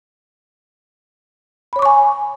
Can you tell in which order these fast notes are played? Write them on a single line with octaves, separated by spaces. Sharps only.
B5 C#5 D6 C#6 G#5